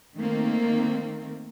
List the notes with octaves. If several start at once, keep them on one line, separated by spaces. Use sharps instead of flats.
D#3 A3 A#3 C4